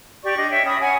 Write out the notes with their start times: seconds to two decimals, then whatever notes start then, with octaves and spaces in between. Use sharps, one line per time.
0.23 G4 D5 C#6
0.37 D4 D#5
0.49 C#5 E5 G5
0.64 C#4 B5 D#6
0.79 C#5 F#5 G#5 B5